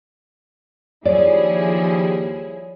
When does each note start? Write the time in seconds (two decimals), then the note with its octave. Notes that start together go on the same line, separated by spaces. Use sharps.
1.05 D#2 F3 G3 E4 G#4 C#5 D5